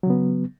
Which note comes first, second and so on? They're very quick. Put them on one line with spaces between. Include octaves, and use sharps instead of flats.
F#3 C#3 B3